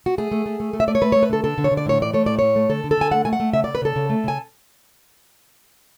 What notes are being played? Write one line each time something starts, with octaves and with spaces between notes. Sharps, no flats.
F#4
A3 G#4
A3
A3
A3
A3
E5
A3 D5
C#5
A3 B4
A3 C#5
B4
D3 A4
D3 A4
D3
C#5
D3
D5
A2 C#5
E3 D5
A3 C#5
A2 D5
A2 C#5
A3
D3 A4
D3
A4
D3 G#5
A3 F#5
A3 G#5
F#5
A3
C#3 E5
C#3 D5
B4
C#3 A4
C#3
A3
C#3 G#5